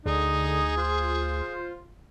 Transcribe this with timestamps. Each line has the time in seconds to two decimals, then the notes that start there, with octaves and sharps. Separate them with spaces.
0.06 D2 D3 D#4 G#4
0.77 F4 C5